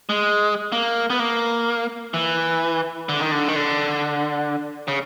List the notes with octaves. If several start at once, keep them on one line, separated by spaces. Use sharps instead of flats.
G#3
A#3
B3
A#3
E3
D3
D#3
D3
D#3
D3
C#3